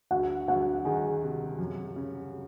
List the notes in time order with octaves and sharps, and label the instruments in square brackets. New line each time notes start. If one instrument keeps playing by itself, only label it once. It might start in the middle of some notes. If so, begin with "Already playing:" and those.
[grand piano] D2 [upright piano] F#4 F#5
[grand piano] D2 [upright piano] F#4 F#5
[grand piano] D#3 [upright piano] G#4 G#5
[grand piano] C3
F#2
C#3